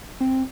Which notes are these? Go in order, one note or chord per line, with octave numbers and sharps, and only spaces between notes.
C4